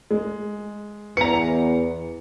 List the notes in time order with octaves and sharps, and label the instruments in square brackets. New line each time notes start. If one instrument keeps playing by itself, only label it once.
[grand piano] G#3
[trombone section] E2 [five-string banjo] B4 A#5 [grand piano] C#7